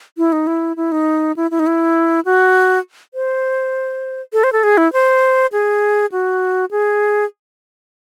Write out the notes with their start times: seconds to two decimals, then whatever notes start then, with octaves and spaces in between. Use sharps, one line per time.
0.18 E4
0.32 D#4
0.47 E4
0.76 E4
0.92 D#4
1.36 E4
1.51 E4
1.59 D#4
1.67 E4
2.25 F#4
3.14 C5
4.33 A4
4.44 C5
4.53 A4
4.63 G#4
4.77 E4
4.93 C5
5.52 G#4
6.12 F#4
6.71 G#4